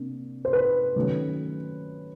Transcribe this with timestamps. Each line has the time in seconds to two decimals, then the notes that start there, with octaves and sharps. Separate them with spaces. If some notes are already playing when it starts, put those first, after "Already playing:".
Already playing: C3 A#3 D4
0.45 C5
0.53 B4
0.96 D#3 F#3 A3 C#4